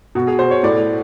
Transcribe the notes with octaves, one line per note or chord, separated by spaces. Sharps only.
B2 F#4
G#4
B2 C5
C#5
A2 D5